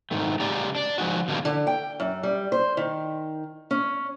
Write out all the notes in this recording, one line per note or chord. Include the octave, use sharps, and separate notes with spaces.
G#2 D#3 A3
C#3 G#3 G4 D5 D#5 A#5
D4 D5
F3 G#3 D#4 F#4
B2 D3 D#3 G3 A#3
D3
G5
F#2
G3
C5
D#3
C#4